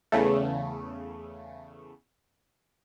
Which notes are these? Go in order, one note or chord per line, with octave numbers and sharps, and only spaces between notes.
E2 C#3 A3